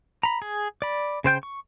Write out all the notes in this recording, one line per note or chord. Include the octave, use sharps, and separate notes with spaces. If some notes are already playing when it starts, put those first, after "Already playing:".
A#5 B5
G#4
D5 B5
C#3 C5 G5 G6
C#6